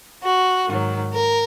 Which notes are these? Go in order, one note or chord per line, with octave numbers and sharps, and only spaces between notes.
F#4
G#2 D#3 F#3
A#4